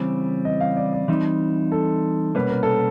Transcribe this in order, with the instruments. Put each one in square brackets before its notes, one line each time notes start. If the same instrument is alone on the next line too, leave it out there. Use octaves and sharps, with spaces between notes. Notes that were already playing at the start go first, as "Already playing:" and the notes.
Already playing: [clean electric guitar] C#3 E3 G3 C4
[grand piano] D#5
F5
D5
D5
[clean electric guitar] E3 G3 C4 D#4
[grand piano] A4
[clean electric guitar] C2 B2 G3 A#3 C#4 [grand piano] B4
[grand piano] A#4
A4